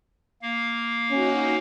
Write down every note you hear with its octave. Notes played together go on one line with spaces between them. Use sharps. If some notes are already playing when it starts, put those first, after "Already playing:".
A#3 F5
C#4 D#4 F#4